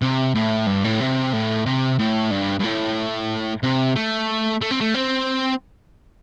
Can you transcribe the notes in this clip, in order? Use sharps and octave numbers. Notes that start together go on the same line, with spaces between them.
C3
A2
G2
A2
C3
A2
C3
A2
G2
G2
A2
C3
A3
A3
C4
A3
C4